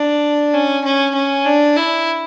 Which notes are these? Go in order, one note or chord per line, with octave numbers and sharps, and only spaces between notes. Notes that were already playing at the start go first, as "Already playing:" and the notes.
Already playing: D4
C#4
C#4
C#4
D4
E4